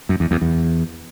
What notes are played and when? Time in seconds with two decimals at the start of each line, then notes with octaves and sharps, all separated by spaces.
0.09 F#2
0.20 E2
0.31 E2
0.42 E2